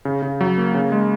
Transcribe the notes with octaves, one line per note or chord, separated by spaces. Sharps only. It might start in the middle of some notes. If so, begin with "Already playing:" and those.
C#3
C#3
F#3
A#3
C#3
G#3